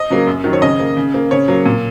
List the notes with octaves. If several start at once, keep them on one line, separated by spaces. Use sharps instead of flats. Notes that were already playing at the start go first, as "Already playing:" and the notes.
Already playing: D#5
C#3 F#3 A#3
F#2
D#3 F#3
C#5
C#3 D#5
A#3
C#3
A#3
C#3 C#5
F#3 A#3
A#2